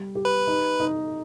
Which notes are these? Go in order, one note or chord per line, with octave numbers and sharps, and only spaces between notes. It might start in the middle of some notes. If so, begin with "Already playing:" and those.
Already playing: G3
G4
B4
D#4
D#4